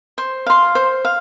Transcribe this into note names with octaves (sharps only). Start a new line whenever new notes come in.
C5
F5 C6
C5
F5